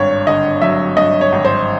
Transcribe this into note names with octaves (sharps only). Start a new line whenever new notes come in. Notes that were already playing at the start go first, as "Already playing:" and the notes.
Already playing: G#1 G2 C#5
D3 D#5
F#3 E5
G2 D#5
C#5
G#1
C5